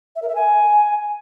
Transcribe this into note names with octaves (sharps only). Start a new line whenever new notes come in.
E5
A#4
E5
G#5